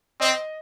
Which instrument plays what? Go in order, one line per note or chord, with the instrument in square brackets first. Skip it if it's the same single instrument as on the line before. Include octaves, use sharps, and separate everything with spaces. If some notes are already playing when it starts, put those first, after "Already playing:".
[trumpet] C4 [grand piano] D#5